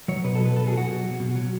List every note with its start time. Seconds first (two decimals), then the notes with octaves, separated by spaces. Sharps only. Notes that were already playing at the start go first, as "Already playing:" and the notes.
0.08 F#3 C#5
0.24 B2 B4
0.35 A4
0.40 F#3
0.46 B4
0.56 B2 A4
0.67 G#4
0.72 F#3
0.77 F#4
0.88 B2
1.04 F#3
1.20 B2
1.35 F#3